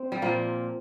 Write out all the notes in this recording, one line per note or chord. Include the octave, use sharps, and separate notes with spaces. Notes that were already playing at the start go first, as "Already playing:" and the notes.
Already playing: C4
G3
A#2 F3 A#3